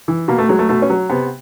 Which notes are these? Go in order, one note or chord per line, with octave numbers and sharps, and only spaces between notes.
E3
B2 A#3
A3
F#3 G#3
A3
B2 A3
C#4
F#3
C3 B3